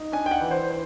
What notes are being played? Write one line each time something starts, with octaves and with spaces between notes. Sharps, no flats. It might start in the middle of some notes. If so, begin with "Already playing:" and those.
Already playing: D#4
D4 G#5
G5
F#5
E3
C5
C5